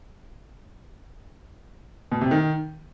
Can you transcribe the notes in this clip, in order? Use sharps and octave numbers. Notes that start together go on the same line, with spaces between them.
B2
C3
D#3